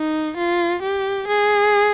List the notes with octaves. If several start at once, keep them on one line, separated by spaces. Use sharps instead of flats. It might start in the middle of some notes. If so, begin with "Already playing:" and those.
Already playing: D#4
F4
G4
G#4